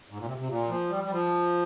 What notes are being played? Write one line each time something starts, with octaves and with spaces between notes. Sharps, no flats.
G#2
A#2
C3
C3
A#2
F3
G3
G3
F3